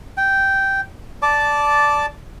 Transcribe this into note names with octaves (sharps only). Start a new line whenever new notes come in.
G5
D5 A5 D6